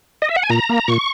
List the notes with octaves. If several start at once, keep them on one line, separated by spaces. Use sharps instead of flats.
D#5
E5
F#5
G#5
A#2 A#5
A#3
A#2 C#6